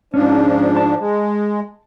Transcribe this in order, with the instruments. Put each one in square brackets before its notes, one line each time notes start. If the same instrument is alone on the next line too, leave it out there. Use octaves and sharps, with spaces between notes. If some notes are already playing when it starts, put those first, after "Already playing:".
[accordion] G#2 F3 D4 [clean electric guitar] C#4
[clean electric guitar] A5
[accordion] G#3